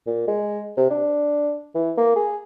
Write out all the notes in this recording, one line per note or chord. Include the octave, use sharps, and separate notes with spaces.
A#2
G#3
C3
D4
E3
A#3
G#4